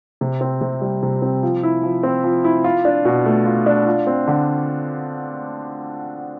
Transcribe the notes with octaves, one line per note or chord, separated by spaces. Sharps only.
C3
C4
C3
G3
C3
C4
F3
E4
F3
C4
F3
E4
F4
D4
B2
A3
F4
D4
F4
C4
D3